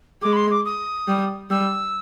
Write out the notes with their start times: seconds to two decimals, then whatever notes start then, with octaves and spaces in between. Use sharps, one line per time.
0.22 G#3 D6
0.33 B5
0.36 C6
0.51 D6
0.65 D#6
1.08 G3
1.50 G3 E6